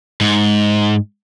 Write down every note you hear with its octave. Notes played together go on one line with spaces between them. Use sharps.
G#2